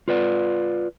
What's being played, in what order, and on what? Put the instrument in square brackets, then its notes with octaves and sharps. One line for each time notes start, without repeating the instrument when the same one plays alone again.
[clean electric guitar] F4 B4 D5